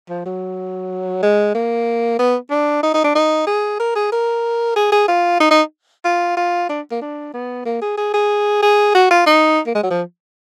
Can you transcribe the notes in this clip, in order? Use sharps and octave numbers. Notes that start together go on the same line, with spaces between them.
F3
F#3
G#3
A#3
B3
D4
D#4
D#4
D4
D#4
G#4
A#4
G#4
A#4
G#4
G#4
F4
D#4
D#4
F4
F4
D4
A#3
D4
B3
A#3
G#4
G#4
G#4
G#4
F#4
F4
D#4
A#3
G#3
F#3
F3